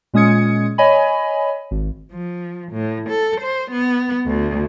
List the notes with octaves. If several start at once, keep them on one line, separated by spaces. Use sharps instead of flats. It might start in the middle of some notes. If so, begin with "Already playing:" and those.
A#2 G#3 C#4 D#6 G#6 C#7
C#5 D#5 G#5 B5
G#1
F3
A2
A4
C5
B3
D2